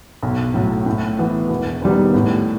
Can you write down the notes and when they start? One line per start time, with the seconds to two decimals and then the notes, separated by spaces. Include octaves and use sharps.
0.23 B1
0.54 A2 F#3
0.86 A2
1.19 E3 B3
1.49 E1
1.82 D#2 D#3 G3 B3
2.14 A2